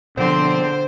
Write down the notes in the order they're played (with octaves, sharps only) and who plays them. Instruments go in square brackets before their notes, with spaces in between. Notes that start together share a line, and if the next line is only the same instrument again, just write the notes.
[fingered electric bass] B2 F3 [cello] D3 [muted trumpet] C4 [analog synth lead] C5